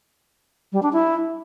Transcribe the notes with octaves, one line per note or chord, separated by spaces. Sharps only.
G3
D4
E4